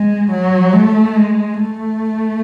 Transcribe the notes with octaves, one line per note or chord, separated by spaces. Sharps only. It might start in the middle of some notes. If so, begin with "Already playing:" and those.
Already playing: G#3
F#3
A3
G#3
A3